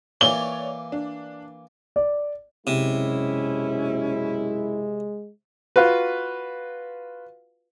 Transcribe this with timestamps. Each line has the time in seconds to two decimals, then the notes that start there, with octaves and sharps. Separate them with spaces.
0.21 E3 A#3 C#5 D5 D6 G7
0.92 D4
1.96 D5
2.67 B1 F#2 C3 G#3 C#4 E4
5.76 F4 F#4 B4